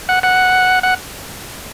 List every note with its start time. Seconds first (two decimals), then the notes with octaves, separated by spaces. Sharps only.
0.09 F#5
0.23 F#5
0.83 F#5